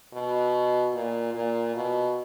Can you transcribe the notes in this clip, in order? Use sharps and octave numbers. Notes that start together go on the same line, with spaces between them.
B2
A#2
A#2
B2